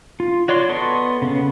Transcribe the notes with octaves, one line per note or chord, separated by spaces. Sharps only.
F4
F#4 C#5 D5 C6
B3 A4 D#5 C6 C#6
C#3 B3